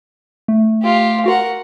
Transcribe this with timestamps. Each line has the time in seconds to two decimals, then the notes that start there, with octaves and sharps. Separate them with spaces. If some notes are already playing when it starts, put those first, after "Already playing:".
0.48 A3
0.82 F4 G4
1.26 F#4 A#4 F#5